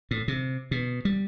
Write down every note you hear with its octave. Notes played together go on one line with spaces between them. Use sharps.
A2
C3
B2
G3